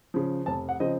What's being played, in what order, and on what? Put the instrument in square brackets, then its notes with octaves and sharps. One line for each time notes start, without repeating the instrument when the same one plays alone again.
[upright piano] C#3 F3
F1 A5
F#5
C#3 F3 C4 D#5